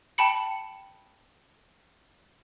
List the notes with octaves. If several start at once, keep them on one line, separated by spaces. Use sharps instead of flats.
G5 A5 B5 C#7